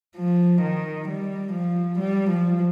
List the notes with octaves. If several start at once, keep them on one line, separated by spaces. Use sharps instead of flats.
F3
D#3
G3
F3
G3
F3